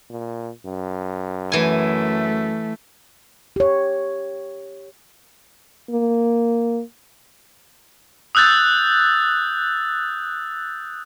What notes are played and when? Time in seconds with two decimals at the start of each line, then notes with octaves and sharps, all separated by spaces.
0.10 A#2
0.66 F#2
1.52 E3 A3 G#5
3.56 G4 C#5
5.90 A#3
8.35 D#6 E6 F#6 G6 A6